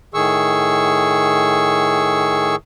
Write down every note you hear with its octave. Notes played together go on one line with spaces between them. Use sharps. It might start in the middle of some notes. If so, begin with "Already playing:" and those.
A2 D#3 G#4 C#6 E6